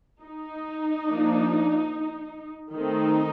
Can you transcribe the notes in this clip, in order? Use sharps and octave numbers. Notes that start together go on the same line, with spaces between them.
D#4
F3 A#3 D4
D#3 A3 C4 D#4